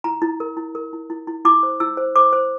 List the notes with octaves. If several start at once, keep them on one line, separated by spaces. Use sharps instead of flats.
E4 A#5
E4
A#4
E4
A#4
E4
E4
E4
E4 D6
C5
E4 E6
C5
C5 D6
C5